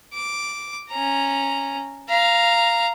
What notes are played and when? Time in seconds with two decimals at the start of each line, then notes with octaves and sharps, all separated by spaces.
0.14 D6
0.89 C#4 A#5
2.09 F5 A#5